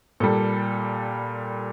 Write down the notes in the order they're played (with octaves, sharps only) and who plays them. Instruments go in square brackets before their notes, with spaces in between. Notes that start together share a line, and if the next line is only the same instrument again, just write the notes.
[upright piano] A#2 G3 A4